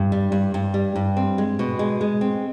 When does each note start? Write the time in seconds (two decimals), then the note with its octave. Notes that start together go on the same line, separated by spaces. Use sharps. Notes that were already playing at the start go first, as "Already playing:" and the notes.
Already playing: G2
0.12 G3
0.32 G2
0.54 G2
0.74 G3
0.96 G2
1.17 C4
1.38 G#3
1.59 B2
1.79 G#3
2.01 G#3
2.21 C4